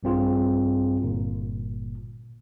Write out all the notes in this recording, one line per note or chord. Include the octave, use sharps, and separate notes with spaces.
A#1 G2 C4 F4 G#4
G1 A#2